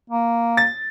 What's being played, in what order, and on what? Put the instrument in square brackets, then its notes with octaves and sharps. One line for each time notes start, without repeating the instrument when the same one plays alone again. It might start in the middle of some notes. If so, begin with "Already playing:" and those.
[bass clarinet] A#3
[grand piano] A6